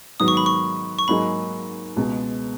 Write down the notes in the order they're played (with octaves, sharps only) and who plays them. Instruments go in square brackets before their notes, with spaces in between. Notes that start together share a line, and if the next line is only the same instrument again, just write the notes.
[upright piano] G#2 D#3 F#3 B3 [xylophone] D#6
[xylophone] C#6
B5
C#6
C#6
[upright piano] G#2 F#3 A#3 D#4 G#4 [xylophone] B5
[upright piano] C#2 B2 G#3